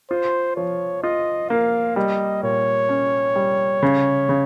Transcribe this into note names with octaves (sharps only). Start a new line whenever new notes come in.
F4 C5
F3 C#5
F4 D#5
A#3 F5
G3 D#5
A#2 C#5
C#4
G3
C#3
C#3